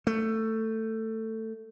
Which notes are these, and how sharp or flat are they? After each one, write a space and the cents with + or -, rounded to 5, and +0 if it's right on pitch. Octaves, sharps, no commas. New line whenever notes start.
A3 +15